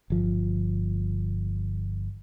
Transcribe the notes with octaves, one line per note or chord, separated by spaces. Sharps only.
G1 F3